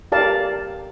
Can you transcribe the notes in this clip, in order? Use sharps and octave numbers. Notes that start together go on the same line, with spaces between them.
G4 A#4 D5 F5 A5